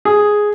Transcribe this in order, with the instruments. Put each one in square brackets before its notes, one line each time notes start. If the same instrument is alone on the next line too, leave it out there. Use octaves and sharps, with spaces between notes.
[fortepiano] G#4